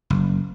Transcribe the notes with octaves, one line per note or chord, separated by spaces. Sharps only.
F#1